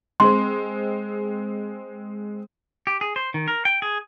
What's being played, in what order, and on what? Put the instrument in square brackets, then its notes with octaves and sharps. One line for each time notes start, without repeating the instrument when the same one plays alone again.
[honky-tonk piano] G#3 C4 [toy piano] C6
[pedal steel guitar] G4
G#4
C5
D#3
A#4
G5
G#4